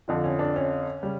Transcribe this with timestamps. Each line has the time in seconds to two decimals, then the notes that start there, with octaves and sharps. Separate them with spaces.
0.08 F2 D3 F3
0.24 C#4
0.39 D4
0.56 C#4
1.03 C#3 G3